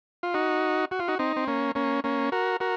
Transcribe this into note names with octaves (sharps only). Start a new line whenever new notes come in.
F4
D#4 F#4
F#4
F4
D#4 F#4
C4 D#4
C4
A#3 C#4
A#3 C#4
A#3 C#4
F#4 A#4
F#4 A#4